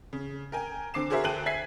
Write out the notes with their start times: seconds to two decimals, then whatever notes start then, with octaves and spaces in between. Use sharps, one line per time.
0.13 C#3
0.52 A#4 G5 G#5
0.94 D3 C4 D6 C7 E7
1.10 F#4 G#4 A#4 C5 E5
1.24 D2 G5 A5 F#6 D#7 F#7
1.46 E5 G#5 G#6 B6 C7